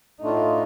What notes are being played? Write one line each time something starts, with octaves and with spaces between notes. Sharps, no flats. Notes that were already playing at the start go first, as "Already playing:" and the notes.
A2 A3 D4 D#4 F4